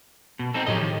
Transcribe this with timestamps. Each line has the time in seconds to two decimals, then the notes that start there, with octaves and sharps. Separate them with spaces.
0.39 B2
0.54 C4 D#4 A4
0.67 A2 F3 F#3 G4 D#5
0.81 D#3